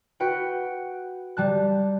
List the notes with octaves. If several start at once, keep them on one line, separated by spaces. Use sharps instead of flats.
F#4 B4 F#5 G5
G3 A5 F#6